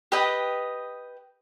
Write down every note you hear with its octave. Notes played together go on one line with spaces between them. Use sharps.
G4 B4 D#5 G5